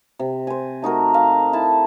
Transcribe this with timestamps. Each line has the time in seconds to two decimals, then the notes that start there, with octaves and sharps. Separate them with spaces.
0.19 C3
0.47 C5 G#5
0.82 A3 D#4 F#4 A#4
1.14 F5
1.53 E4 A5